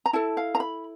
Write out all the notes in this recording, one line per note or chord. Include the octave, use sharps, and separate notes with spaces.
A#5
E4 A4 A5
F5
A#5
B5